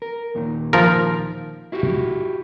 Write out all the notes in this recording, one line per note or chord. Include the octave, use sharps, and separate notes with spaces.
A#4
D#2 A#2 D#3
F3 A#4
E4 F#4 G4